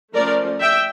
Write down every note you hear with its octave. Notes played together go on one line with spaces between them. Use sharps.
F3 A3 C#4 A#4 D5
E5 G5